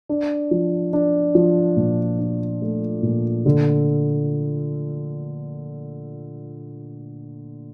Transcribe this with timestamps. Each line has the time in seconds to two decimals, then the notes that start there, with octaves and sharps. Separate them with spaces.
0.09 D4
0.51 F3
0.93 D4
1.35 F3
1.77 A#2
2.19 D4
2.62 A3
3.03 A#2
3.46 D3